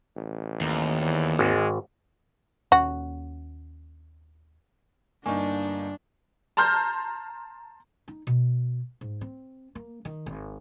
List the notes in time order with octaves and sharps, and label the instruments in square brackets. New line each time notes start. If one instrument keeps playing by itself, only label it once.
[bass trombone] A1
[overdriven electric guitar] D#2
[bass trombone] E2
[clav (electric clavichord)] G#1 [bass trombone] G#3
[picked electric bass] D#2 C#4 [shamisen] F#4
[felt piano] G1 [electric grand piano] A#3 D#4 [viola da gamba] D4 [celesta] G#5 C#6
[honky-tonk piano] A5 A#5 C6 F6 G6
[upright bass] D#4
B2
G#2
C4
A#3
D#3
G#1